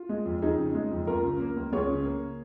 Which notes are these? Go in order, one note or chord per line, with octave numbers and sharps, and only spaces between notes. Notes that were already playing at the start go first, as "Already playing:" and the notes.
Already playing: F4
G#3
F2
F2 D#4 G#4
C#3
G#3
F2
C#2 F4 A#4
C#3
A#3
C#2
C#2 G#4 C#5
C#3
A#3